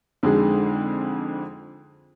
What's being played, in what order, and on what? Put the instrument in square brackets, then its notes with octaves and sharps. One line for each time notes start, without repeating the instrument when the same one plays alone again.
[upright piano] F2 D3 G#3 D#4 G#4